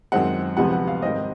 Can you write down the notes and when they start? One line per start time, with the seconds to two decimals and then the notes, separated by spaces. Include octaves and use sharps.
0.12 F#2 D#3 G#3 C4 F#5
0.57 D2 C3 F3 G#3 B3 F#5
0.72 F#5
0.87 F5
1.02 G#2 D#3 G3 C4 D#5